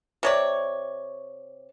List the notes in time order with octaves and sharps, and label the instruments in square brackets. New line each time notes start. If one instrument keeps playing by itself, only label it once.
[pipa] C3 C#5 D5